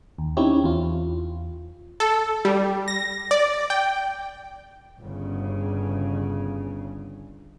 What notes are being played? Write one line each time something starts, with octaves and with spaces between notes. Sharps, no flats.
D#2
C4 C#4 D#4 E4 G4 C#5
E2 F4
A4
G3
A#6
D5
G5
G1 C#3